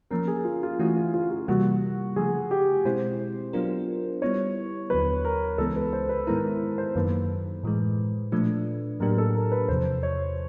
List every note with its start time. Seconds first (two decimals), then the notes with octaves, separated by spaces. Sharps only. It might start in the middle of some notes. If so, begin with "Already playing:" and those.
0.10 F3 A#3 C#4 A#4
0.28 G#4
0.45 F4
0.63 F4
0.79 E3 A3 C#4 E4 F#4
0.96 F4
1.14 F4
1.31 F4
1.48 C3 E3 G3 A#3 F#4
2.16 C#3 F3 A3 G#4
2.51 G4
2.85 B2 G#3 C4 E4 C5
3.53 F#3 B3 D4 F4 A#4
4.22 G3 B3 E4 C#5
4.90 D#2 D3 F#3 B3 B4
5.25 A#4
5.58 C#2 C#3 E3 G#3 B3 A4
5.76 B4
5.93 C5
6.09 B4
6.27 G#2 D#3 G#3 B3 E4 A#4
6.78 C5
6.95 F#2 D#3 F#3 A#3 B4
7.63 A2 E3 G#3
8.32 A#2 F3 A3 D4
9.00 A2 F#3 A#3 D4 G4 A#4
9.18 A4
9.35 A#4
9.52 B4
9.68 E2 C3 F3 C5
10.03 C#5